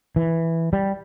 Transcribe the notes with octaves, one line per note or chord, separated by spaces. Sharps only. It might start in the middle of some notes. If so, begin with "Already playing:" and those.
E3
G3